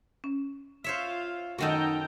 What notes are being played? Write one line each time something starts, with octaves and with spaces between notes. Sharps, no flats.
C#4
F4 C5 C#5 E5 F5
F#2 D#3 D#4 F#4 A4 G5 A#5